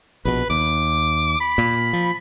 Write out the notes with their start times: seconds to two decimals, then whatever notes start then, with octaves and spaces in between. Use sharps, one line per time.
0.25 A#1 B2 B4
0.50 D#2 D6
1.40 B5
1.58 A#2
1.93 F3